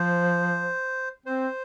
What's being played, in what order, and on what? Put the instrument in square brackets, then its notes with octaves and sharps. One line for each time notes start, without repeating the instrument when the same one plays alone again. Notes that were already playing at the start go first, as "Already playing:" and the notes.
Already playing: [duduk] F3 [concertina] C5
[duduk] C4 [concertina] C5